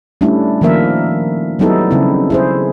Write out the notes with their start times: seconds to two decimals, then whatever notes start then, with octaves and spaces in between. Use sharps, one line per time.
0.21 G3 A3 C#4 D4 E4
0.61 D#3 F3 A#3 A#4 E5
1.59 F#3 G3 B3 D#4 E4 A4
1.91 C#3 C4 E4
2.30 E4 G#4 C5